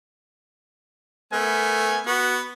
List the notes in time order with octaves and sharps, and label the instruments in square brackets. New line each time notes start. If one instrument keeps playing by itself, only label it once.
[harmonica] A3 [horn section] B3 A#4 G#5
[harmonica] B3 [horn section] F#4